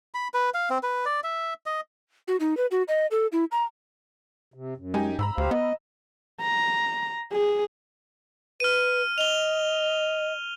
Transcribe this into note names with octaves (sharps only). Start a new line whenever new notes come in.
B5
B4
F5
C4
B4
D5
E5
D#5
F#4
D#4
B4
F#4
D#5
A4
E4
A#5
C3
F#2
G#3 D#4 G4 G#5
G#2 A#5 B5 E6
D2 G4 C5 F5
B3 D#5
A#5
G#4
B4 F6 D#7
D#5 F7 G7